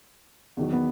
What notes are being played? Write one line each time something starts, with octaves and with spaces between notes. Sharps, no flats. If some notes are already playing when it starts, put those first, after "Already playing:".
E2 D#3 F#3
B3